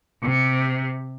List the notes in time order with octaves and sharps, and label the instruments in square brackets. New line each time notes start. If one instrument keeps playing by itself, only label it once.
[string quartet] C3